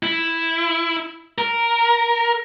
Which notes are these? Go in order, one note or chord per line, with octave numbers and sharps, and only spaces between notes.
E4
A#4